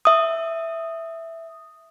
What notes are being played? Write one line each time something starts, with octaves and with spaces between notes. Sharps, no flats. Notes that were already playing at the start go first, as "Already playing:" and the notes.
E5 D#6